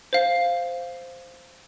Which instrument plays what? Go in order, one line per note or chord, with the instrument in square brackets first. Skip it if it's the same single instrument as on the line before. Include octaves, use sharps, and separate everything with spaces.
[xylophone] C5 F5